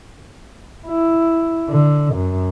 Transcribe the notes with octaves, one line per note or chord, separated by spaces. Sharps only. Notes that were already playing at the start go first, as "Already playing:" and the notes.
E4
D3
F#2